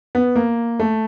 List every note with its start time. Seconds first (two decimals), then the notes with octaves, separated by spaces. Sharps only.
0.15 B3
0.36 A#3
0.80 A3